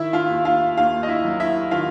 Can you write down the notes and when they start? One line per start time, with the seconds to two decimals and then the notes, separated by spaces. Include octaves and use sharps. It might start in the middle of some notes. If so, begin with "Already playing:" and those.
Already playing: D#3 E4 E5
0.13 F4 F5
0.30 D#2
0.45 F4 F5
0.77 D#2 F4 F5
1.03 D#5
1.08 E4 E5
1.25 F#3
1.40 E4 E5
1.71 D#3 F4 F5